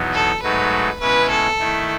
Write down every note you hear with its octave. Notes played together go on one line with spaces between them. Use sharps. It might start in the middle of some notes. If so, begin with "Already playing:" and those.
Already playing: E2 B2 F#3 B3 D#4
A4
G#2 F#3 A3 D#4 F#4 B4
B2 G#3 C#4 E4 B4
A4
D#3 A3 E4